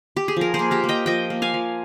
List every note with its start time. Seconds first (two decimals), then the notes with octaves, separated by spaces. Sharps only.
0.16 G4
0.28 G#4
0.36 F3 A#4
0.54 G#4 C5
0.59 A#3
0.71 G4 A#4
0.84 A#3
0.89 D#5 G5
1.06 F3 D#5 G5
1.30 A#3
1.42 F5 G#5
1.54 F3